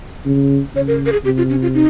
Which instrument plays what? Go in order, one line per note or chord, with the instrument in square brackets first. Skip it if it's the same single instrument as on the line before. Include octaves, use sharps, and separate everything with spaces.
[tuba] C#3
[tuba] C#3 [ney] C#5
[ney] A#4
A#4
G#4
[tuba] C3 [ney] G4
[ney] F4
C#4
F4
D#4